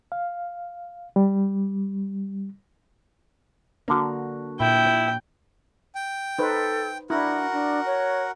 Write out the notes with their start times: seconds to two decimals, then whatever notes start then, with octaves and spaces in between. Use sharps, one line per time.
0.12 F5
1.16 G3
3.88 D3 A#3 D4 F#4
4.60 A#2 E4 G5
5.95 G5
6.39 D#4 A4 B4 C5
7.10 D4 E4 F#4 A#4 F#5
7.52 D4
7.86 C#5